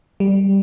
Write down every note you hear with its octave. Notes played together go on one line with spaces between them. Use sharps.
G3